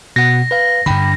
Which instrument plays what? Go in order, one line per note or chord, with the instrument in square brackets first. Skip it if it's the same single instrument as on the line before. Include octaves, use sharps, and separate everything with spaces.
[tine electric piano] B2 F#5 [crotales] A#6
[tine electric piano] B4 F5
[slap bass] G2 D3 [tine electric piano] G5 B5